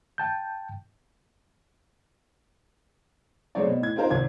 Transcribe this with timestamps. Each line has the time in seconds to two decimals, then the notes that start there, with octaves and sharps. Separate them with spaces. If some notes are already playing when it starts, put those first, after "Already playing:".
0.18 G5 A5 G6
3.55 F#3 G#3 A3 C4 C#5 D5
3.67 B2
3.81 A2 G#6
3.96 C4 D#4 F4 A#4 C5
4.10 G#1 C3 G#6